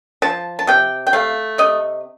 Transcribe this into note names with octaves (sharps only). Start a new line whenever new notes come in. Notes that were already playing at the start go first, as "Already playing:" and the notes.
F3 A5
A5
C3 G5
G5
A3 F5
C3 D#5